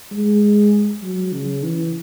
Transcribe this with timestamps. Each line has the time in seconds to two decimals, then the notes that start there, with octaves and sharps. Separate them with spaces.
0.12 G#3
1.03 F#3
1.33 C#3
1.64 E3